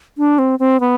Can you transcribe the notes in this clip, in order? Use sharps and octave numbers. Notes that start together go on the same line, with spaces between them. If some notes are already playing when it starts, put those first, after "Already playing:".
D4
C4
C4
B3